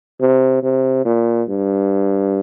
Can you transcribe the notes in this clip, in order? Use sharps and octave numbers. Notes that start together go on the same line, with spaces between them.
C3
C3
A#2
G2